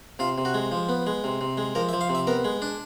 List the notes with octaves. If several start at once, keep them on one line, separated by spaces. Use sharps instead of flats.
C3 F4
C3
F#4
G#3
F3
B3
G#3
C3
C3
G#3
F3 A#4
E5
F3
F5
C3
E5
B3 A#4
G#3
D4